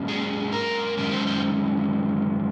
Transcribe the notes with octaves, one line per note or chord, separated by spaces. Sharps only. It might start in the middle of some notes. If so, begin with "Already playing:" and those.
Already playing: G#2 F#3 A#3 C#4
G#4
A#4
F#2 D#3 G#3 C#4 A#4
C5
C5